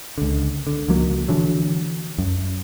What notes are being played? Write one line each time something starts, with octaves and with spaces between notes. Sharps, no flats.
C#2 D3
D3
C#2 F3 F#3 A#3
D3 E3 F#3
F#2